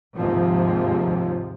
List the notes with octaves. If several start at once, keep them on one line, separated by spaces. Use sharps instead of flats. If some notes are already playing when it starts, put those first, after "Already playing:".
D#2 G#2 C3 F3